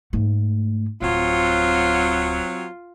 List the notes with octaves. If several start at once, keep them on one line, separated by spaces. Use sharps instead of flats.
G#2 A3
D1 F#3 C4 F4